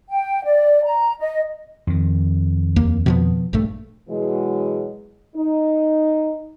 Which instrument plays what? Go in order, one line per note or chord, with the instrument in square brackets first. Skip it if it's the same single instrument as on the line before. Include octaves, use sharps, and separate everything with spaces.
[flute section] G5
D5
A#5
D#5
[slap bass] F2 D#3
[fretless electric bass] D#2 A#3
B2 F3 B3
A#1 G2 A3
[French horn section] B2 E3 F#3 G#3
D#4